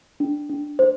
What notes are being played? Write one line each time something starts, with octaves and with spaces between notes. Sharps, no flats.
D4
D4
C5